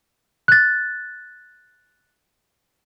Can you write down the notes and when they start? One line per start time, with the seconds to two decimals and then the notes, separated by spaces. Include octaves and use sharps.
0.48 F#6 A6